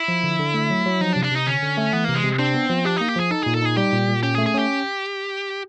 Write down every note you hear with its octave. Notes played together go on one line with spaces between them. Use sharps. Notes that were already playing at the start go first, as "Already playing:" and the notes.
Already playing: E4
F3
D3
D3
A3
F#3
F#3
F3 D#4
D4
C3
D4
C3 D#4
D3 C#4
D3
A3
E3 B3
C3 A#3
G#3
C3
C4 D4
B3
F3
D4 G4
A#3 D#4
G4
F3 G#4
D#4 A4
A#2 G#4
A4
D#4 G#4
G3 G4
A#2
A#2
C#4 G4
G#4
A3
G#4
C#4 G4